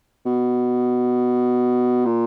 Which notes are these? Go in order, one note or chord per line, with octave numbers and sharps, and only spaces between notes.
B2
A#2